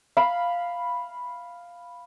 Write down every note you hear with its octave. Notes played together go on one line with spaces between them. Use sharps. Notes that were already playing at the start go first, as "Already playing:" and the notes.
F5 B5